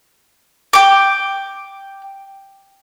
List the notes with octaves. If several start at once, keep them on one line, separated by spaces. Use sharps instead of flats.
G5 D6